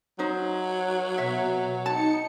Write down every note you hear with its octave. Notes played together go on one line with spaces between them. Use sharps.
F#3 D#4 C5
B2 E5
D#4 A5 C#7